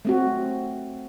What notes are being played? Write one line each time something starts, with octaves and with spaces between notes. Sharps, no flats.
A3 C4 F#4